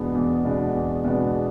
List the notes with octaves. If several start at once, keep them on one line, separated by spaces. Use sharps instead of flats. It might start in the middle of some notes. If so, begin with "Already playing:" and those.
Already playing: E2 B2 G#3 B3 D4
E2
B2 G#3 B3 D4
E2
B2 G#3 B3 D4